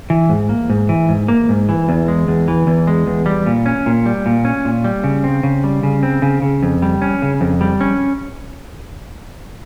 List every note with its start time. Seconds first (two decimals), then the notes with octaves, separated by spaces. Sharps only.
0.10 E3
0.29 G#2
0.49 A#3
0.70 G#2
0.89 E3
1.09 G#2
1.28 A#3
1.49 G#2
1.69 E3
1.89 E2
2.08 G#3
2.28 E2
2.48 E3
2.67 E2
2.87 G#3
3.07 E2
3.26 G3
3.46 A#2
3.66 C#4
3.86 A#2
4.06 G3
4.26 A#2
4.45 C#4
4.65 A#2
4.84 G3
5.04 C#3
5.24 C4
5.43 C#3
5.64 G3
5.83 C#3
6.03 C4
6.22 C#3
6.42 C#3
6.63 F2
6.82 G3
7.02 C#4
7.22 C#3
7.41 F2
7.61 G3
7.81 C#4